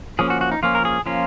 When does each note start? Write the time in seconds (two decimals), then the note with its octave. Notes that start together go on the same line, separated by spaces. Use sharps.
0.19 F3 A#3 C#4 G#4
0.30 F#4
0.41 F#4
0.52 D#4
0.63 F3 A#3 C#4 F4
0.75 A#4
0.85 G#4
1.06 F3 A#3 C#4 F4